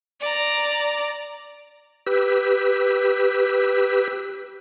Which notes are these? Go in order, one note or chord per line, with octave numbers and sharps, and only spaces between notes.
D5 A#5
G4 B4 E6